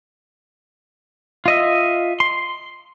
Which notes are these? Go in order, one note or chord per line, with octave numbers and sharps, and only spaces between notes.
F4 D#5 E5
C6